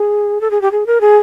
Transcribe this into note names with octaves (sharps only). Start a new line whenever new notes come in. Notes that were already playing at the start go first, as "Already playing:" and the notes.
Already playing: G#4
A4
G#4
G4
G#4
A#4
G#4